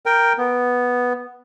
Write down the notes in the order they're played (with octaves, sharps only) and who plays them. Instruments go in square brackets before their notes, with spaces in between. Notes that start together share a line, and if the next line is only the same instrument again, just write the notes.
[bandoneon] A#4 G5
B3